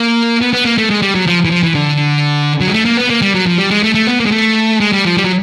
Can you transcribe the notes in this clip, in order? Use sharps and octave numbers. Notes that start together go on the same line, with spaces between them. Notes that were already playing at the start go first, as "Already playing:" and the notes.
Already playing: A#3
B3
B3
A#3
A3
G#3
G3
F#3
F3
E3
F3
E3
D3
F#3
G#3
A3
A#3
B3
A#3
G3
F#3
F3
G3
G#3
A3
A3
B3
A#3
G#3
A3
G#3
G3
F3
G3
F#3